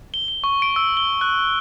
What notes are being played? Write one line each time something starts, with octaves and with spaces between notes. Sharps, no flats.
G7
G7
C#6
D7
E6
G7
F#6